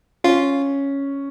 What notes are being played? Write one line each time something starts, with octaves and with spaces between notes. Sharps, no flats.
C#4 F4